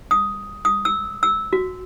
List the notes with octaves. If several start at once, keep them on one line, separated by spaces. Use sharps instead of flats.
D#6
D#6
E6
E6
F#4